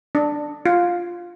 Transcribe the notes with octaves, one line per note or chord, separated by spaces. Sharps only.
D4
F4